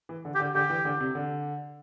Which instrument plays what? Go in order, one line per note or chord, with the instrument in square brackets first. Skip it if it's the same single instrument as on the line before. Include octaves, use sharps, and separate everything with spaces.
[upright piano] E3
D3
[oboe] G4
[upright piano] D3
[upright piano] D3 [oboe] G4
[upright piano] E3
D3
C3
D3